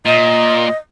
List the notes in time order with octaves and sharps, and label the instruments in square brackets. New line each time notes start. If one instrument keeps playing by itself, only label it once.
[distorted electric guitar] A#2 [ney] D#5